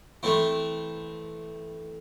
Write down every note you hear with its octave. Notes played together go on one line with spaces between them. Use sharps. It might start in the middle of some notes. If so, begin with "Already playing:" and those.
E3 A3 C4 E4